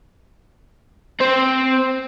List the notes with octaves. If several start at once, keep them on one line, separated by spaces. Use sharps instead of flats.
C4 C5